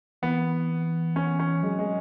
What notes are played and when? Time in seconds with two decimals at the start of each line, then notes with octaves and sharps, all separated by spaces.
0.22 E3 B3
1.16 C#4
1.39 C#4
1.63 F#3 G#3
1.79 G#3